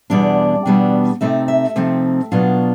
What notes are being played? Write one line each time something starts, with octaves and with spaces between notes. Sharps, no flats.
E2 B2 G3 B3 D4 D5
E2 B2 G3 B3 D4
C3 F3 A3 C4 D#4 E5
E5
C3 F3 A3 C4 D#4
B2 F#3 B3 D4 F4